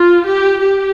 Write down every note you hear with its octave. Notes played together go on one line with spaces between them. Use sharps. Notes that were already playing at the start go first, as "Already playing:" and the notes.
Already playing: F4
G4
G4